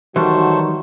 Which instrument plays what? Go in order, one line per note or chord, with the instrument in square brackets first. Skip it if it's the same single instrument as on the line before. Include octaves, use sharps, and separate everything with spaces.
[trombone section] D#3 F#3 [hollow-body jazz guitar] E3 G3 [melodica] A3 C5 C#6 [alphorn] F#4